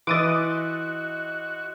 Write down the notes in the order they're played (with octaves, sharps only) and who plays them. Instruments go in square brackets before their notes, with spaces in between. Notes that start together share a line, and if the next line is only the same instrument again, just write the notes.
[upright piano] E3 [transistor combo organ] F#4 [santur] D#5 E5 C6 [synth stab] D6 D#6 A6